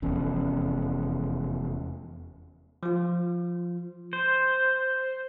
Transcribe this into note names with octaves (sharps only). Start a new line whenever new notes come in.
F1 E2 C#4
F3 F4
C5